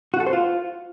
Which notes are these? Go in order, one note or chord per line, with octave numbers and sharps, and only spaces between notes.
F#4
A4
C5
F4